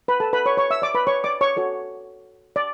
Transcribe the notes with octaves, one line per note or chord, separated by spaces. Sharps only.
B4 B5
A4 A5
B4 B5
C#5 C#6
C#5 C#6
E5 E6
D5 D6
B4 B5
C#5 C#6
D5 D6
C#5 C#6
F#4 A4 C#5
D5